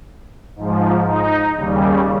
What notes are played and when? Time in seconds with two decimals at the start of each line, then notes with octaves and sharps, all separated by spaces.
0.56 G#2 F3
1.06 D#4
1.57 D#2 C#3 G3